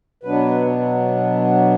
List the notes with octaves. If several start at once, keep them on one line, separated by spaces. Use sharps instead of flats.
B2 F#3 B3 D4 B4